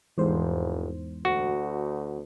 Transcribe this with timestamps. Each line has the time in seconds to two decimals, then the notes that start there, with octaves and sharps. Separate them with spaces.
0.18 F1 E2 G#2 C5
1.25 D2 F#4